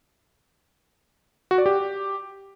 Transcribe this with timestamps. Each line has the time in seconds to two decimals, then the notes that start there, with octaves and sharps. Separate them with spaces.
1.51 F#4
1.58 D5
1.66 G4